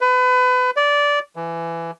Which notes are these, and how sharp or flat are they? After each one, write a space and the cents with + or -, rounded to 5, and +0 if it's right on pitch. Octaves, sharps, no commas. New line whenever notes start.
B4 +30
D5 -15
E3 +20